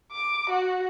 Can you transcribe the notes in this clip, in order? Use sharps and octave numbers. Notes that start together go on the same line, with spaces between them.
D6
F#4